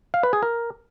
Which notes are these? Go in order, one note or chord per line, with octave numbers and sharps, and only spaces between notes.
F5
B4
G#4
A#4